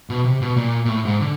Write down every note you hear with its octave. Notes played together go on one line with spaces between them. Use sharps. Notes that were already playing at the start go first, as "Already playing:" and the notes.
B2
C3
B2
A#2
A#2
A2
G#2
D3